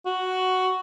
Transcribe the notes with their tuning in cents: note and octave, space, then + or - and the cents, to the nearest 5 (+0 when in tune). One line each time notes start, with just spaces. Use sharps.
F#4 +5